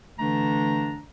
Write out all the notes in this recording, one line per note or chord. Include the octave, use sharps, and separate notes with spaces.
D3 E3 A3 D4 A#5